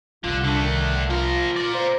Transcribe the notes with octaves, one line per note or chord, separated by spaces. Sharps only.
C2 D3 F4
D3 A3 D4
D#3
F3 F4 A#4
A#4 D5
C5